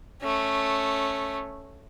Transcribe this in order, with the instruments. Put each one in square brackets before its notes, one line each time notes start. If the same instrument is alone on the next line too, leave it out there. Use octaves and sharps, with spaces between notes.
[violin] A3 C#4